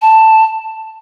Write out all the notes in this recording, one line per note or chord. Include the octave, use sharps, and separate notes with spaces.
A5